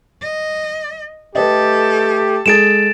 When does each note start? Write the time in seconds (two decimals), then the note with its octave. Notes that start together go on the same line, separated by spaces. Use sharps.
0.22 D#5
1.35 A3 G4 A4 B4 D#5
2.46 G#3 G#4 A4 A6 D7 E7